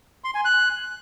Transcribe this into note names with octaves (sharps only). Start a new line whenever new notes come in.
C6
G#5
F#6